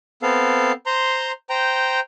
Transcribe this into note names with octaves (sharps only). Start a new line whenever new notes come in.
B3 C4 A4 F5
C5 A#5 C6
C5 G5 A#5